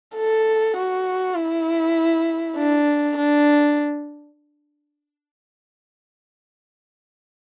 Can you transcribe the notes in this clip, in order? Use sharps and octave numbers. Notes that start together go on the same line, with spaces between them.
A4
F#4
E4
D4
D4